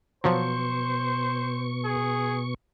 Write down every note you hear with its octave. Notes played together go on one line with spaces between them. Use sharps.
B2 F3 F#3 C5 C#6
G#4